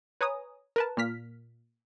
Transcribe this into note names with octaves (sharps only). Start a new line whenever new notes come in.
B4 C#5 G#5 A#5 D#6
A#4 B4 A5
A#2 A#3 F6 B6